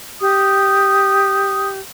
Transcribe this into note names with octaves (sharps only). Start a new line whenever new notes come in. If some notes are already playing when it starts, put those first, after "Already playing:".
G4 D#6